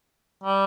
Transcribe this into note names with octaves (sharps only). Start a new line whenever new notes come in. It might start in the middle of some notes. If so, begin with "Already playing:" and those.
G3